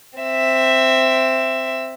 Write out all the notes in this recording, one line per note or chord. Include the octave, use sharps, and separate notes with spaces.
C4 E5